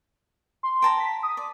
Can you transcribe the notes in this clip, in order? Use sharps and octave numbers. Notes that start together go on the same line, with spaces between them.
C6
G5 A5 A#5
B6
D#6
D5